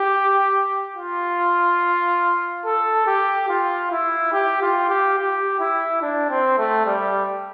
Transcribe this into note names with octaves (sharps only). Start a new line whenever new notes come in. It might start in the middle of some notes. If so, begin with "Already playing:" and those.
Already playing: G4
F4
A4
G4
F4
E4
G4
F4
G4
G4
E4
D4
C4
A3
G3